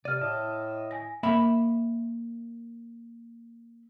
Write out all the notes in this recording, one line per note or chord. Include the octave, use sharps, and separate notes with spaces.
C3 D5 F6 D#7
A2 D#5 E5 A5
G#5 A#6
A#3 E5 B5